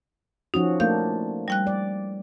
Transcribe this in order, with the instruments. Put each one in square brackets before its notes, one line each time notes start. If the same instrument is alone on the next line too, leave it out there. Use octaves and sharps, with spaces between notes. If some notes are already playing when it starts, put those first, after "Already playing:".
[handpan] F3 C#4 F#4 [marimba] D#4
[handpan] A3 A#3 D4 [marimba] F5 G6
[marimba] G3 G5 F#6
[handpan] D5